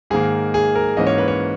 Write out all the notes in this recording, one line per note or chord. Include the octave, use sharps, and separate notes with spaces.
G#2 D#3 A#3 G#4
G#4
A#4
G#2 E3 A#3 C#4 D#5
C#5
B4
C#5